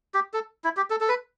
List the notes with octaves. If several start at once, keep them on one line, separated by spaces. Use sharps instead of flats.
G4
A4
E4
G4
A4
A4
B4